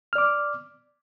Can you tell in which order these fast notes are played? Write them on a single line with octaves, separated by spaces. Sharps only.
F6 D5 D6